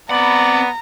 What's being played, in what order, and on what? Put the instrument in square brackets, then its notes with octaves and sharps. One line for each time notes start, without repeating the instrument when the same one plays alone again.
[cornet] B3 [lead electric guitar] C4 B5 [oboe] D5 [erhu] A#5